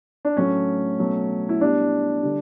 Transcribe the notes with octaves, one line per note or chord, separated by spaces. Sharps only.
D4
A2 F#3 A3 C#4
B2 F#3 A3
E4
B2 G3 D4
D3 G3